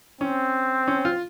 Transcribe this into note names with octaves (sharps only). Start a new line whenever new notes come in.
C4 C#4
C#4
F4